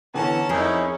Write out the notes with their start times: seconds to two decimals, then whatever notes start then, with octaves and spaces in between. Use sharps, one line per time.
0.14 D3 E3 B3 C#4 A5 A#5
0.49 F2 D#4 E4 G#4 A#4 G6